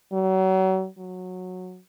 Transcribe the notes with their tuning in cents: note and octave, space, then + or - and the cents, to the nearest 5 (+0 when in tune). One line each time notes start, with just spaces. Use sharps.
F#3 +35
F#3 -15